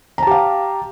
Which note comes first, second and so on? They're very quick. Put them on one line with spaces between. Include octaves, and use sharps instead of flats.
A#5 A5 G4 F5